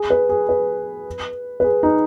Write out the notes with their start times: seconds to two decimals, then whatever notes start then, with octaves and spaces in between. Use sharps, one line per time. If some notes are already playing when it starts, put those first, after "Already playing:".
Already playing: G#4
0.10 B4
0.29 G#4
0.49 B4
1.60 B4
1.64 G#4
1.83 D#4